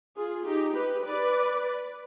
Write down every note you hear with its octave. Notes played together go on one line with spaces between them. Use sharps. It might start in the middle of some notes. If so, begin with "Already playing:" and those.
F4 G#4
D#4 G4
G4 B4
B4 D5